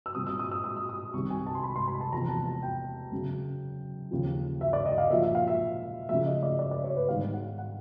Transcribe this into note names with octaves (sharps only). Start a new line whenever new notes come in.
E6
A#2 G3 C4 D#6
E6
D#6
E6
D#6
E6
D#6
C2 C3 D#3 G3 C#6
G#5
A5
C6
B5
C6
B5
A5
E2 C3 F3 A#3 A#5
A5
A5
G5
F#2 C#3 F#3
D#2 C#3 F3
E5
D5
D#5
F5
A#2 F3 A#3 E5
E5
F5
E5
C#3 F3 A3 E5
D#5
D5
D5
D5
C#5
B4
G#2 D#3 G3 B3 F5
F#5
F#5